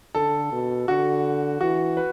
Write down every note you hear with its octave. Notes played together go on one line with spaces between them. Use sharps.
D3 A4
B2
D3 F#4
E3 F#4
B4